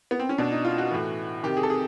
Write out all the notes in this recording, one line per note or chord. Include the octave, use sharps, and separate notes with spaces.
B3
C4
C#4
B2 D4
D#4
F4
F#4
A2 E3
C3 D#3 G4
G#4
A4
G#4